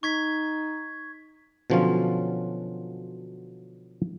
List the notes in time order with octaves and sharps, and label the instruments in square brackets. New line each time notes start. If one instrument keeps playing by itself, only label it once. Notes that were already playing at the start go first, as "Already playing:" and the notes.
[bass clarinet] D#4 [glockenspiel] C#6 G#6 B6
[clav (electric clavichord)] B2 D3 F3 F#3 C#4 F4